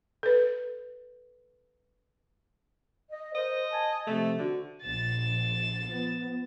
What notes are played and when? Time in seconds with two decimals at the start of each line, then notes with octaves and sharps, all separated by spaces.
0.23 A4 B4
3.10 D#5
3.35 A#4 C5 D#5
3.71 G#5 A5
4.07 C3 F3 A3 C4
4.39 D3 F#4
4.84 A#1 A6 E7
5.85 F3 B3